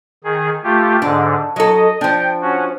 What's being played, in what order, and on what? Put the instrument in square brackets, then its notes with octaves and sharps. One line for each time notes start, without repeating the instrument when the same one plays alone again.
[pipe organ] D#3 G#4
A3 F4 G4
[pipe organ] G#2 D3 [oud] D4
[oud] F#3 A4 [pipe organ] D#5
[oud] F3 D4 [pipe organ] G5
[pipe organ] C#4 F#4